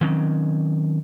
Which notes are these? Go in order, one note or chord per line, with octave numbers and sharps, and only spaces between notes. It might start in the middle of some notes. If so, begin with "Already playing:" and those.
D#3 F#3 C4 C#4